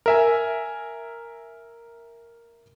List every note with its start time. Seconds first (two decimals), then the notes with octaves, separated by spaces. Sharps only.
0.06 A#4 E5 G#5